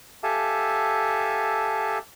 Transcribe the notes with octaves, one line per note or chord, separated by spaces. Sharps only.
G4 A4 E5 F5 G#5 A5